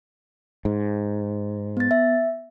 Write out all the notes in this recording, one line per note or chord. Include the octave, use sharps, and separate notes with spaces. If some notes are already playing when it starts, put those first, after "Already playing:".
G#2
B3 A6
E5